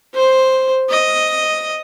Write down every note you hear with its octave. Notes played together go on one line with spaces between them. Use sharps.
C5
D#5